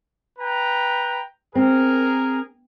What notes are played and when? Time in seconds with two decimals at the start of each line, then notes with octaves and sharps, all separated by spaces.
0.39 B4 G5 A#5
1.55 C4 G#4 A#4